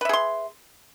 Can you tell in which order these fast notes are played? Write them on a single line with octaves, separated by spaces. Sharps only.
B4 E5 G#4 C6